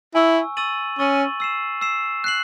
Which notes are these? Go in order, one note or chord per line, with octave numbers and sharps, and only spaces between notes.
E4 G#5 C#6 E6
C#6 E6 A6 D#7 F#7
C#4 C#6 E6 A6 D#7 F#7
E6 C7 E7
E6 C7 E7
F#6 C7 F#7